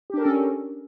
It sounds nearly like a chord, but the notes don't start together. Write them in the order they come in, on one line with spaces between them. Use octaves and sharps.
G4 D4 A#4 A4 C#4